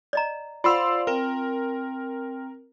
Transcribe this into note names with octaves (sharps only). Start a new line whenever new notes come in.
D5 D#5 A#5
F4 C5 D5 F5 F#5 C6 E6
C4 A#4 G5